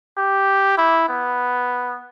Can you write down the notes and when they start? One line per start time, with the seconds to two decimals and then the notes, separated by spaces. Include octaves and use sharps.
0.17 G4
0.78 E4
1.09 B3